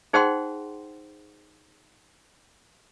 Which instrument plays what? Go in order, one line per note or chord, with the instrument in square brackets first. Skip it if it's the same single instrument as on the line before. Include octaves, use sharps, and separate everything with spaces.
[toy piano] D#4 G#4 C5 F#5 G5 C6